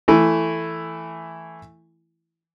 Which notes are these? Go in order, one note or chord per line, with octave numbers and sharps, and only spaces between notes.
E3 A3 E4